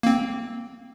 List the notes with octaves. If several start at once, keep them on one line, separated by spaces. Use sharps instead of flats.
A#3 C4